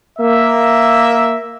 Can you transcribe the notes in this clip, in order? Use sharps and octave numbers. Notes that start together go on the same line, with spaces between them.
A#3 E5